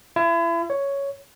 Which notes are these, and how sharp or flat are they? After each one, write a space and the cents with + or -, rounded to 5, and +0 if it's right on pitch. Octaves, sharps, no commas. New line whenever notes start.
E4 +35
C#5 +5